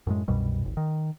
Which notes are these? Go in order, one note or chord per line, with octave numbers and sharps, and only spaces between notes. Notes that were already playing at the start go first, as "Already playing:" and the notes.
F#2 A2 G#3
C2 F#2 B2 G3
D#1 G#1
D#3